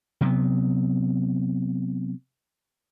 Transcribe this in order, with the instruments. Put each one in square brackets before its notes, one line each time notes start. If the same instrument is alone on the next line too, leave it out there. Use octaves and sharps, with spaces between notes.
[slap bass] C3 F#3 B3